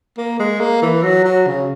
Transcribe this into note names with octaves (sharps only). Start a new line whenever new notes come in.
A#3
G#3
A#3
E3
F#3
F#3
C#3